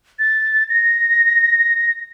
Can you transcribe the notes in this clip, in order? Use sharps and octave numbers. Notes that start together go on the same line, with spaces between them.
A6
A#6